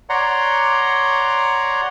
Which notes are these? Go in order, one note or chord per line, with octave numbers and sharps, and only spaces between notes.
C#5 D5 F#5 A#5 C6